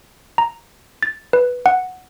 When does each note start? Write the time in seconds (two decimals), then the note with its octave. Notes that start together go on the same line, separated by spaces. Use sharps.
0.38 A#5
1.03 A6
1.33 B4
1.66 F#5